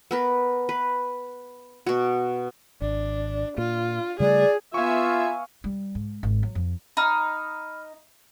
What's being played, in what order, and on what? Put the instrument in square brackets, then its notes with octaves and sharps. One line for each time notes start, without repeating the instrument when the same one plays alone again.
[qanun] B3 A#4 B4
B4
B2 F#4
[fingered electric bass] G#1 [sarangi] D4
[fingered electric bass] A#2 [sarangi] F4
[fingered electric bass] C#3 G3 A3 [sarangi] G#4 [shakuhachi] D5
[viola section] B3 E5 G#5 [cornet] F4 [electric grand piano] F5 C#6
[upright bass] G3
G#2
G#1
F#3
F2
[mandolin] D#4 [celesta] B5 F6